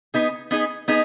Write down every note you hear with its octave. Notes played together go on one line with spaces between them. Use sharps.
B3 D#4 G#4
B3 D#4 G#4
B3 D#4 G#4